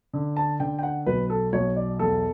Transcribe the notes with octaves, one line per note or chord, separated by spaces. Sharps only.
D3
A5
D3 G5
G5
F#5
B1 B4
A4
B1 C#5
D5
E2 A4